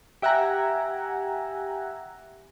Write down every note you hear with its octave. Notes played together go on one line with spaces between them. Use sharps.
G4 E5 F#5 G#5 A#5